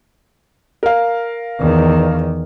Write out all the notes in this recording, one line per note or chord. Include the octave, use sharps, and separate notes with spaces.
A#4 F5
E2 D#3